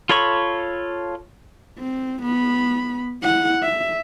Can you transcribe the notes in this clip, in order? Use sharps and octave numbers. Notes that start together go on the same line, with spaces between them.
F4 A4 C#5 B5 C#6
C4
B3 B5
E4 F#5
E5